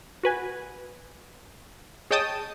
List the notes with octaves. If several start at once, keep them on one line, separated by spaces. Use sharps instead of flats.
F#4 B4 G#5
G#4 C#5 D#5 G5 A5 D#6